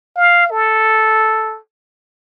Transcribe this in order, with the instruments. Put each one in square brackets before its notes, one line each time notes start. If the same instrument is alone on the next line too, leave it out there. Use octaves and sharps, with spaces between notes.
[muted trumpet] F5
A4